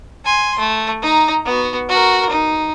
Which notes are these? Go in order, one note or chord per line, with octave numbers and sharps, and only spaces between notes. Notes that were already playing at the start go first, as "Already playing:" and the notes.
G#5 C6
A3
D#4 A#5
B3 F#4
F#4 A#4
D#4